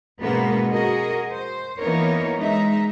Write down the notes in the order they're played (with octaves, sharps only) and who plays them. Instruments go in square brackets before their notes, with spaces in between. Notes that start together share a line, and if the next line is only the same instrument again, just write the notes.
[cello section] G#2 B2 G#3 A#3 B3 C#4
F#4 G#4 A#4 D#5
C5
E3 A#3 B3 D#4 A#4 C#5
G#3 D#4 E5